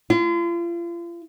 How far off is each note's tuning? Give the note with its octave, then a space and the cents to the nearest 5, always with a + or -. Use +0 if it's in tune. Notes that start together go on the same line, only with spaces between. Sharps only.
F4 -40